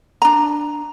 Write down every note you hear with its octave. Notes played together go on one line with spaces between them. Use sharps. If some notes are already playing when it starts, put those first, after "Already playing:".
D4 A#5